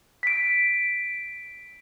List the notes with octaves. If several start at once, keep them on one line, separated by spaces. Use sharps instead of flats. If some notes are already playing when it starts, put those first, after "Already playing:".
B6 D7